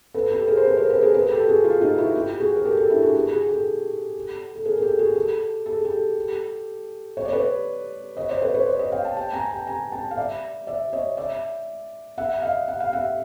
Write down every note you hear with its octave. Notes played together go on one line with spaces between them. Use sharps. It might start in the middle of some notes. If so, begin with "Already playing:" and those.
A4 B4
G4 A4
G#4 A#4
C5
A4 B4
A#4 C5
A4 B4
G#4 A#4
A4 B4
G4 A4
F#4 G#4
F4 G4
D#4 F4
E4 F#4
F4 G4
F#4 G#4
A#4
G4 A4
G4 A4
D4 E4
F#4 G#4
F#4 G#4
F#4 G#4
G4 A4
A4
G#4 A#4
G#4
G4 A4
F#4 G#4
G4 A4
A4
G#4
G4 A4
C#5
D5
B4 C#5
C#5 D#5
C5 D5
B4 C#5
B4 C#5
C5 D5
C#5 D#5
F5 G5
G5 A5
G5 A5
G#5 A#5
G5 A5
G#5 A#5
G5 A5
F5
D5 E5
D5 E5
C#5 D#5
D5 E5
E5 F#5
D#5 F5
F#5
F5
E5 F#5